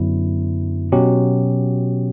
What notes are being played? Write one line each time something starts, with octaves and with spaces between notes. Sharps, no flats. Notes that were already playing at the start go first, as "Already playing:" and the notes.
Already playing: F#2 D3 F#3 B3 E4
B2 F#3 C#4 G4